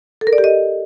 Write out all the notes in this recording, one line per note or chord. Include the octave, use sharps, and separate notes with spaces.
A4
A#4
D5
G4
D#5